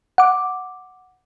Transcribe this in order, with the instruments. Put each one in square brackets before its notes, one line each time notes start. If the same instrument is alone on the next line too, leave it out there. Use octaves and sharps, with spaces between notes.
[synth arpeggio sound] F#5 D6